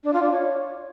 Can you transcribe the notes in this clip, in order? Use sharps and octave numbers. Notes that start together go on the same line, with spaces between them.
D4
F4
D4
C#5